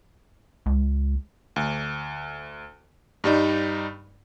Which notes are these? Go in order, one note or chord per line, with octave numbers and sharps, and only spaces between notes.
C#2
D2
G2 G3 D#4